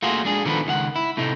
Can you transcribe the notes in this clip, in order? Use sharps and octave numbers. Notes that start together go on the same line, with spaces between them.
A3 A#3 F4 F#4 G#4
G#3 D4 G#4
D3 D#3 F3 B3 A4 B4
C#2 D#3 F5 F#5
E4
A2 C3 A3 D#4